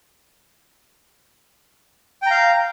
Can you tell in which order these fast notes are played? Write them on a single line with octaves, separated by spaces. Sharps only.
G5 A#5 F5